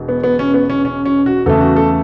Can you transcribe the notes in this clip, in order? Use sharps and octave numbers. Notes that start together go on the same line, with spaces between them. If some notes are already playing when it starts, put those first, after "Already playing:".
Already playing: E1 E2 B2
B3
B3
C#4
B3
C#4
C#4
C#4
F#4
E2 C#3 A3 A4
F#4
A4